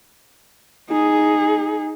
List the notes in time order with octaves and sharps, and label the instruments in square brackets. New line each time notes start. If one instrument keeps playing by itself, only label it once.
[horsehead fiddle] D#4 G#4